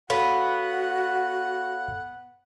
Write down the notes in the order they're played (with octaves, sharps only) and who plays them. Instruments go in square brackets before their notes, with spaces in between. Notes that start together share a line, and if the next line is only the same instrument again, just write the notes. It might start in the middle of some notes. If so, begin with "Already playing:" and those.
[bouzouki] B3 [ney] F#4 [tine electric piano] A4 C#5 F5 [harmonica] F#5